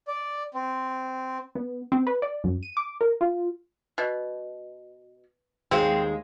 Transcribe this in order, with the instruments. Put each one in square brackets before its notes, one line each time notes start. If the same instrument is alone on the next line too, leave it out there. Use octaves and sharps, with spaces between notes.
[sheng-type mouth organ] D5
C4
[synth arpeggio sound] B3
C4
B4
D5
F#2
D#7
D6
A#4
F4
[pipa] B2
[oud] D#2 G#3 [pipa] C4